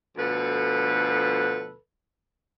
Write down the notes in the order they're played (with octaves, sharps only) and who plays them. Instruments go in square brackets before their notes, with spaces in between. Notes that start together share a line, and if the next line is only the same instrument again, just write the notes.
[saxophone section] D2 B2 F3 A4 B4